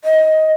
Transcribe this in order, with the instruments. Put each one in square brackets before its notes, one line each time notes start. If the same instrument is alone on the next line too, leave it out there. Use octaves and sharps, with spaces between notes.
[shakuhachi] D#5